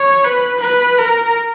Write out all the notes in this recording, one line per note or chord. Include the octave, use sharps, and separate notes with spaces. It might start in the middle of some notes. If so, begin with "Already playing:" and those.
Already playing: C#5
B4
B4
A#4